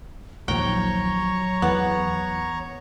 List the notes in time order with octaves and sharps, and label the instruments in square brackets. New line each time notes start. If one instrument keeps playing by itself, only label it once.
[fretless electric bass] A#1 D#2 F3 [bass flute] F#3 [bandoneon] C#5 A#5 C#6 [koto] G5
[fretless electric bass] E2 [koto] B3